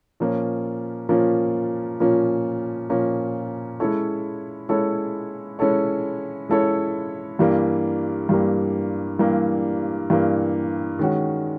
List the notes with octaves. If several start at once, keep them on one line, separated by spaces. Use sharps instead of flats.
A#2 F3 A#3 C#4
A#2 F3 A#3 C#4
A#2 F3 A#3 C#4
A#2 F3 A#3 C#4
G#3 C#4 E4 A4 C#5
G#3 C#4 E4 A4 C#5
G#3 C#4 E4 A4 C#5
G#3 C#4 E4 A4 C#5
G2 E3 G3 A#3
G2 E3 G3 A#3
G2 E3 G3 A#3
G2 E3 G3 A#3
D#3 G#3 C#4 F#4